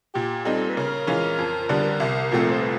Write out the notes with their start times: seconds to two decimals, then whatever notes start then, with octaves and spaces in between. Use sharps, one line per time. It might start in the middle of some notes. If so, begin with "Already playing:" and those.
0.15 A#2 G4
0.45 G3 C4 D#4 A4
0.70 B4
0.77 C#3 A#4
1.07 E3 G#3 C#4 F4
1.39 F2
1.69 D3 G3 B3 D4
2.00 C2
2.32 A#2 F3 A3 C4
2.51 C5
2.62 B4